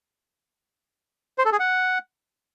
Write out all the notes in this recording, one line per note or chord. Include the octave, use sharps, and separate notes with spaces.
C5
A4
G#4
F#5